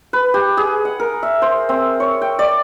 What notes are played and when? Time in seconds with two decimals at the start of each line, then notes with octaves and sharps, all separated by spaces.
0.13 B4
0.34 G4
0.57 G#4
0.85 F#5
1.00 A#4
1.23 E5
1.42 C5
1.69 C4
2.00 C#5
2.21 G5
2.39 D5